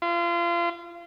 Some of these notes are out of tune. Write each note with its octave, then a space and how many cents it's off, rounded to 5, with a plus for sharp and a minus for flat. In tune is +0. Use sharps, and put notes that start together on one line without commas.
F4 -30